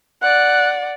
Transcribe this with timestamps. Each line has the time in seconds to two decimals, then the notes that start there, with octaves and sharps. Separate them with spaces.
0.22 D5 F#5 F#6